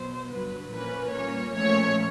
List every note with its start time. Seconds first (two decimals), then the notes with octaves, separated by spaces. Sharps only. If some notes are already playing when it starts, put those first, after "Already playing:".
Already playing: B2 F#3 B3 C5
0.30 G2 D3 F#3 B4
0.71 A#2 F3 A#3 C#4 B4
1.12 A#2 G3 A#3 C#4 C#5
1.54 A#2 F3 A3 C#4 C#5